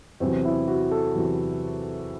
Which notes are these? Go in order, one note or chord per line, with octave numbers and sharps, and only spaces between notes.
E2 C3 F#3 C4
E4
F#4
A4
E2 C3 F#3